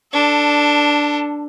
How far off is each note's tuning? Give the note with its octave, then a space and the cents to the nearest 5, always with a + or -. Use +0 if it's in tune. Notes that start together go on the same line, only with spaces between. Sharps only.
D4 +0 A4 +20